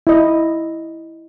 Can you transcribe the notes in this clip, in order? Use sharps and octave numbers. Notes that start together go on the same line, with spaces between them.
E4 D#5